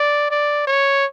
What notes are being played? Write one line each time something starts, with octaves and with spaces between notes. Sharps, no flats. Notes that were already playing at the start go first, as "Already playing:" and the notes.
Already playing: D5
D5
C#5